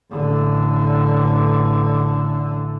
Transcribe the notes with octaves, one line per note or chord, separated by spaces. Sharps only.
A1 D3